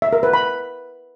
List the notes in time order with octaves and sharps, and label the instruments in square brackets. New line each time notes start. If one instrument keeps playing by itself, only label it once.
[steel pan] E5
A#4
B4
B5